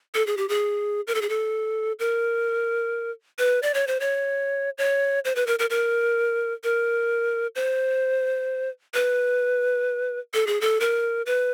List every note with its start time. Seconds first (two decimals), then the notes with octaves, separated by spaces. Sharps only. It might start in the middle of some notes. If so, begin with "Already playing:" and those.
0.15 A4
0.27 G#4
0.37 G4
0.49 G#4
1.07 A#4
1.15 A4
1.22 G#4
1.29 A4
1.99 A#4
3.39 B4
3.63 D5
3.74 C#5
3.87 C5
4.00 C#5
4.78 C#5
5.25 C5
5.36 B4
5.47 A#4
5.59 A#4
5.70 A#4
6.64 A#4
7.55 C5
8.94 B4
10.34 A4
10.47 G#4
10.61 A4
10.80 A#4
11.26 B4